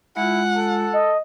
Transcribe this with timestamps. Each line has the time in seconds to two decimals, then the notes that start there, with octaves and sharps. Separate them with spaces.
0.17 G#3 E4 F4 F#5
0.57 A4
0.93 D#5